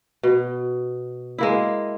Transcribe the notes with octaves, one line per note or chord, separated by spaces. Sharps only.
B2
G#3 A#3 E4